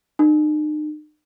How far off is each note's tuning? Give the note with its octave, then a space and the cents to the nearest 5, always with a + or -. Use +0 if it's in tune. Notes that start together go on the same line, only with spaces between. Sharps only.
D#4 -40